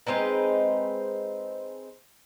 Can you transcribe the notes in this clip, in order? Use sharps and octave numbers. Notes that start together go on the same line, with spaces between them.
G#3 C4 D#4 B4